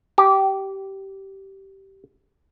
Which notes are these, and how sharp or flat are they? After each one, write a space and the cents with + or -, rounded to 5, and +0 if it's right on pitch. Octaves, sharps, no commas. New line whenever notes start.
G4 -15